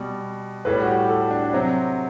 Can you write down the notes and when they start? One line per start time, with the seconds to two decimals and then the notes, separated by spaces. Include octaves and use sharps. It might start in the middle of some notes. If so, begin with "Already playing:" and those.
Already playing: B2 G3
0.65 A2 G3 B4
0.82 F#4
0.87 G4
1.09 A4
1.31 D4
1.53 C3 F#3 C5